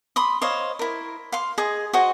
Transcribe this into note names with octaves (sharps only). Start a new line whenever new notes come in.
B5 C6 D#6
C5 C#5 D#5 F5
E4 A#4
F5 C6
G#4 D#5 D#6
F#4 G#4 C5 D#5